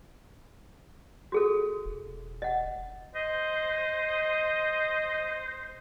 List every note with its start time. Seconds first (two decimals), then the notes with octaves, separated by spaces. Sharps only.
1.32 F#4 G#4 A4
1.85 E1
2.42 D#5 F#5
3.15 C5 D#5